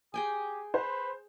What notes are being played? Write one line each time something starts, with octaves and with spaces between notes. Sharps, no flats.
G4 G#4 G5 G#5
B4 C5